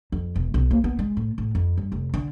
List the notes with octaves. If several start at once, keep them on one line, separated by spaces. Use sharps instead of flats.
F2
E1
B1
A#3
B3
G#3
A2
A2
F2
G2
F1
D3